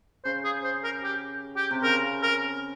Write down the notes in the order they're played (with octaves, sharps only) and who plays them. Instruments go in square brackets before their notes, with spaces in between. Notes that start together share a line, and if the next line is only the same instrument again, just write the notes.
[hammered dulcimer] C#3 [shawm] C5
[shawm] G#4
C5
A#4
G4
G4
[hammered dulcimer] C3
[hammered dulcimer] C#3 [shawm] A#4
[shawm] A#4